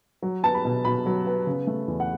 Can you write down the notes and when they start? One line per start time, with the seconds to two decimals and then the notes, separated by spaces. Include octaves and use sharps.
0.22 F#3
0.43 B3 A5
0.54 B5
0.65 B2
0.85 B2 B5
1.06 F#3
1.27 B3
1.47 C#3
1.67 A3
1.88 E2
2.00 F#5